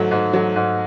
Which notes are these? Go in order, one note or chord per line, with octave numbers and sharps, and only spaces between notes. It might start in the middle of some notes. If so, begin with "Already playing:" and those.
Already playing: G#2 F#3 A3
G#2
F#3 A3
G#2